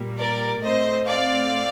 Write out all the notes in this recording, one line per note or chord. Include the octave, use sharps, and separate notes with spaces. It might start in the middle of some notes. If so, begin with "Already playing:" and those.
Already playing: A#2 G3 A#3
A#4 D5
A2 A3 C4 C5 D#5
D5 F5